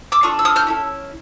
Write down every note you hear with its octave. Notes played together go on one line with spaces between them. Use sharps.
D6 E6
D4 F4 A4 C#6 D#6
E6
D#6 F6
F6 G6
C#4 E4 A4